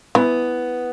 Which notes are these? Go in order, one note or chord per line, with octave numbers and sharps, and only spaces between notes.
E3 B3